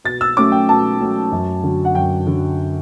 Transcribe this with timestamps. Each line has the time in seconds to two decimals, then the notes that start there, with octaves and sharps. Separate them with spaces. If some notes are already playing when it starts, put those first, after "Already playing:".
0.04 B2 A6
0.21 E6
0.37 F#3 A3 C#4 D6
0.52 G5
0.69 B2 A5
1.00 F#3 A3 C#4
1.32 F#2
1.63 D3 F#3
1.85 F#5
1.95 F#2 G5
2.27 D3 F#3